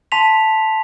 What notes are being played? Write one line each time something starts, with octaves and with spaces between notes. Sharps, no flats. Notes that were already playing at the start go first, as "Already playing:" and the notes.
A5 C6 B6 F7